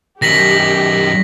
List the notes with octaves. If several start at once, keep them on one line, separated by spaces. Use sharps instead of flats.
F#2 D#3 G4 A#6 B6 F#7